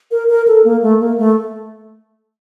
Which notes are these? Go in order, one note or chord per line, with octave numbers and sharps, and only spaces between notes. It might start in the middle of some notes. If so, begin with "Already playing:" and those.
A#4
A#4
A4
A#3
A3
A#3
A3